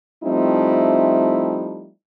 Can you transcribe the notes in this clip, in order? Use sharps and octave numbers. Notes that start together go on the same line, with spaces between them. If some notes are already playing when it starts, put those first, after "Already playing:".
F3 G3 A3 C4 D#4 E4